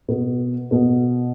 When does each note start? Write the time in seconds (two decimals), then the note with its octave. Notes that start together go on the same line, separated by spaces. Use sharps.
0.08 B2 B3
0.71 B2 B3